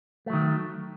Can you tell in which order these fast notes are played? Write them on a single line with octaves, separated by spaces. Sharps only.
A3 F#3 D#3